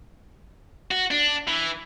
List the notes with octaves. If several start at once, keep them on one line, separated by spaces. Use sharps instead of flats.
F#4
D4
E3